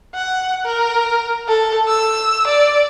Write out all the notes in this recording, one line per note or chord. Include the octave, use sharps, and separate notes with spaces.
F#5
A#4
A4
E6
D5